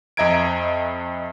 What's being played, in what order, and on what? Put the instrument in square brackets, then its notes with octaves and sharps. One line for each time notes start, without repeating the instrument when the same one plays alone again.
[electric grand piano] F2 D#5 E5 A#5 G#6 D7